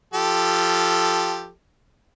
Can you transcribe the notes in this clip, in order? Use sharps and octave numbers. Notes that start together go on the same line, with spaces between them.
F3 G4 A4